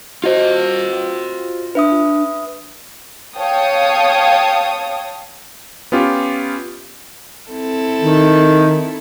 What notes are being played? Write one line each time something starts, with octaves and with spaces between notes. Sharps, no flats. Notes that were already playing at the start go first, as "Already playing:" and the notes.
F4 F#4 C5 D#5
D4 B4 E5 D#6
C#5 F5 G5 A5 D#6
B3 C#4 F4 G4
C4 E4 A4
D#3